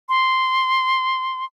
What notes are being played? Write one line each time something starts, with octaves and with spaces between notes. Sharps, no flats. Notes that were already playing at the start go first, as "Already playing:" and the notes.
C6